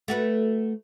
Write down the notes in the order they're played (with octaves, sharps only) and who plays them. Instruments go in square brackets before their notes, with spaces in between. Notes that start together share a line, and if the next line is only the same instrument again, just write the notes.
[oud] A3 F#4 B4